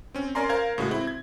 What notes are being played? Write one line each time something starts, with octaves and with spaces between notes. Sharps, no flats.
C4 C#4
C#4 A#4 D5 G#5 A#5 C6
A#4 C5 F5 A#5 G#6
A2 C#3 G#3 F#4
C4 E4
G#6